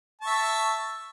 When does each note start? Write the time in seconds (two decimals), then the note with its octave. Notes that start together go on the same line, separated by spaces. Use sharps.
0.21 A5
0.24 C#6
0.27 E5